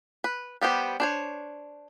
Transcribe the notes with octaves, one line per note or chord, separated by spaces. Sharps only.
B4
G3 B3 G4 C5
D4 C5 C#5